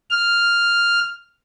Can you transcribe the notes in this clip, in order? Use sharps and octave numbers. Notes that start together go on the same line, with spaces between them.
F6